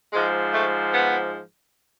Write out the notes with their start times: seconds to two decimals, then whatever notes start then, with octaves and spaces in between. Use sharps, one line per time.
0.13 G#2 F3 G#3
0.53 A3
0.93 B3